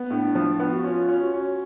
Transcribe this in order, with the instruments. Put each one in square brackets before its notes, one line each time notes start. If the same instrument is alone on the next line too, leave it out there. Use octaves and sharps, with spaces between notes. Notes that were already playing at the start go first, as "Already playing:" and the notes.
Already playing: [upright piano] B3
[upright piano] A2 [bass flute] D4
[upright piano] F3
B3
[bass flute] F#4
[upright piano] C#4 [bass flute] F4
[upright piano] C#4
[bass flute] F#4
[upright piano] C#4